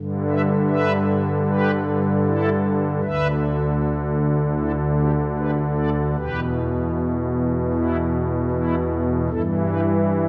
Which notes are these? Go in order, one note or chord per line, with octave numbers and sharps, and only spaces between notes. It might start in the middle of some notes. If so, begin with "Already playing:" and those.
Already playing: G2 D3
B4 E5
B4 E5
G4 B4
E4 A4
D2 D3 B4 E5
E4 A4
D4 G4
G4 B4
A4 D5
E2 B2 G4 B4
B3 E4
B3 E4
G2 E3 E4 A4
G4 B4